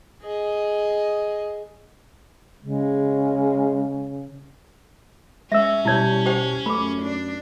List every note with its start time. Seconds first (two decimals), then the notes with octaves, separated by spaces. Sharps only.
0.22 G#4 D#5
2.63 C#3 G#3
5.52 G#3 C#4 E5 E6
5.85 B2 G3 E4 C#5 A5 G#6
6.26 G4 C5 G5
6.66 F#2 A3 B5 D6
7.02 D4